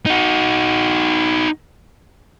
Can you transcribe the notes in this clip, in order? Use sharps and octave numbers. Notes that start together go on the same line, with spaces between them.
D#4 F#4